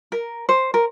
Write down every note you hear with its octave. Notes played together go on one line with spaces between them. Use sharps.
A#4
C5
A#4